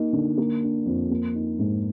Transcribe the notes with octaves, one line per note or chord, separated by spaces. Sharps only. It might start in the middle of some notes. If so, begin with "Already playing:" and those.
Already playing: A#3 D#4
D3
A#3
D4
F2
A#3
D#4
G#2